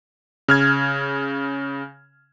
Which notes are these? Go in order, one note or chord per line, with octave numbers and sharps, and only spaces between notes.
C#3 F6 G#6